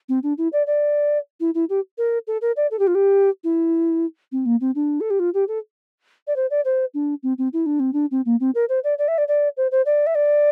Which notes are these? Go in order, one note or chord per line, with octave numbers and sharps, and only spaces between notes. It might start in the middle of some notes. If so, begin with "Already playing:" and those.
C4
D4
E4
D5
D5
E4
E4
G4
A#4
A4
A#4
D5
A4
G4
F4
G4
E4
C4
A#3
C4
D4
A4
G4
F4
G4
A4
D5
C5
D5
C5
D4
C4
C4
E4
D4
C4
D4
C4
A#3
C4
A#4
C5
D5
D5
E5
D5
D5
C5
C5
D5
E5
D5